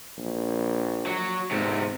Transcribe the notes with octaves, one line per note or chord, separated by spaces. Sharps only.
A#1
F#3
E2 G#2 C3